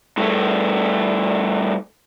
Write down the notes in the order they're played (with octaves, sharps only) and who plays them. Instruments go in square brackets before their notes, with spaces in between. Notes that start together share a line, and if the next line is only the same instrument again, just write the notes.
[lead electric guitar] G2 A3